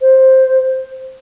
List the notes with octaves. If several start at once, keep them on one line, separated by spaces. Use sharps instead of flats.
C5